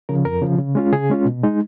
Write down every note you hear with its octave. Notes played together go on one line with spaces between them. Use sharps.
C#3 F3 A#4
F2 A#4
C#3 F3
C#3
G#3 C#4 F4
C#3 G#4
G#3 C#4 F4
B2
G#3 D#4